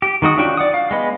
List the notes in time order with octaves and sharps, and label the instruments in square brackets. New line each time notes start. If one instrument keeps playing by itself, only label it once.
[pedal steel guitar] G4
D#3 G#3 F#4 D#6
C#4 D4 F4 F#4 G5
D5 F#5 D#6
F5
G#3 B3 D#5